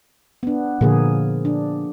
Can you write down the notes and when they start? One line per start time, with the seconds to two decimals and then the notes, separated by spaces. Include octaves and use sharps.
0.43 B3 D4
0.81 A#2 D3 F3 A#3 G#4
1.45 D4